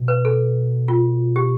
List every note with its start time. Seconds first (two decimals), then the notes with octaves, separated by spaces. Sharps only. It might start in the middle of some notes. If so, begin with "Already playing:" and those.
Already playing: B2
0.08 B4
0.25 A4
0.88 F4
1.36 G4